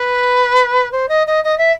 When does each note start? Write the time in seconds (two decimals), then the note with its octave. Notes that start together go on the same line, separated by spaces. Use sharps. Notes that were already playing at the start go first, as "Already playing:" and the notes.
Already playing: B4
0.91 C5
1.08 D#5
1.26 D#5
1.44 D#5
1.57 E5